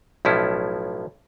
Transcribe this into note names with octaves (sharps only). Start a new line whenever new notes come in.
B1 A2 F3 C#4 E4